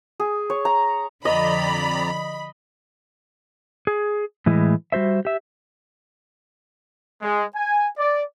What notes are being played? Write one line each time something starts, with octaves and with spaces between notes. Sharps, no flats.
G#4
C#5
A#5
F2 D3 F3 D5 D#5 A#5 B5
G#4
A2 E3 G#3 E4 D#5
G3 F#4 C5 E5
G4 E5
G#3
G#5
D5